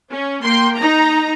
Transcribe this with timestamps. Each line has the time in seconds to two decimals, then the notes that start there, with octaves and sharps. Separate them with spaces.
0.10 C#4
0.44 A#3 G5 C6
0.77 D#4 A#5